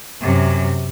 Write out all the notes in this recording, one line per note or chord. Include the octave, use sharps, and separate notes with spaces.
F#2 C3